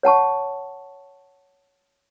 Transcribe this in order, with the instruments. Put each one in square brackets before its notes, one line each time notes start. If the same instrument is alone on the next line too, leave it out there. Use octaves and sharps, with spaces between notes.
[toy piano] C#5 F#5 A5 C#6